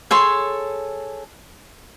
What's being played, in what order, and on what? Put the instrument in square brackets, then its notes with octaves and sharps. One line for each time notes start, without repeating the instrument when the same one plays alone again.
[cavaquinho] G#4 A4 C#5 C6